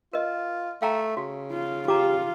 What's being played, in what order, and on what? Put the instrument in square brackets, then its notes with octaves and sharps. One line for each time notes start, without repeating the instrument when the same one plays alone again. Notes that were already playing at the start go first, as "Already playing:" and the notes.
[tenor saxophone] F4 [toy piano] A#4 D#5
[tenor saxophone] A3 [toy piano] F5 G5 A#5
[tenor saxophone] C#3 [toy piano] F#4
[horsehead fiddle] F4
[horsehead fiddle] F4 [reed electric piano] G4 [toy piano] A#5 D6